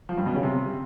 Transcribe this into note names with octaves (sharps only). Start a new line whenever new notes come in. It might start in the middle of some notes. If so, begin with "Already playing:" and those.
F3
G2
B2
C#3
C3